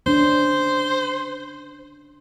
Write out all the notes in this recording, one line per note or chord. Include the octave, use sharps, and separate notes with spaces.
C#4 D4 C5